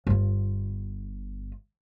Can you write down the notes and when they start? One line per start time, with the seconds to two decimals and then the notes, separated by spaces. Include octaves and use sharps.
0.07 G1 F4